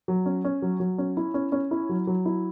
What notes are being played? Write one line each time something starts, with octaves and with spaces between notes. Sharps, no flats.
F#3
C#4
C#4
F#3
F#3
C#4
E4
C#4
C#4
E4
F#3
F#3
E4